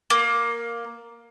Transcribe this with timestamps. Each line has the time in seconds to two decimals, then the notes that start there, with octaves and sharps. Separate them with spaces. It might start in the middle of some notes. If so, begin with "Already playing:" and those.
0.10 A#3